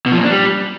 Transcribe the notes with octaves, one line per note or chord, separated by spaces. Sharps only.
B2
F3
A#2
D4
G3